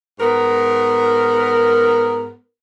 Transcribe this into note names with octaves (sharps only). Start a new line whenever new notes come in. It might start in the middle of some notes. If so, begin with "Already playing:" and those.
G#2 B3 A#4